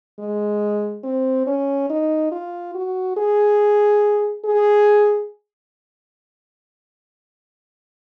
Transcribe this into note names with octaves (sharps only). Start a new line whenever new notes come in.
G#3
C4
C#4
D#4
F4
F#4
G#4
G#4